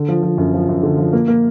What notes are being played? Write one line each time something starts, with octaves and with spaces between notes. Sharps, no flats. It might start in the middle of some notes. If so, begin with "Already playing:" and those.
Already playing: D3
F3
F3
F#2
F3
F#2
D3
F3
A#3
A#3